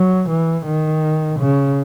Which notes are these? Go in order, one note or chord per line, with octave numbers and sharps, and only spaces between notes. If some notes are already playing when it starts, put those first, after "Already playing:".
Already playing: F#3
E3
D#3
C#3